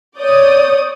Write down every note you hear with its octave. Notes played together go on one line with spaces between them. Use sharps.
C#5 D5 D#6 G6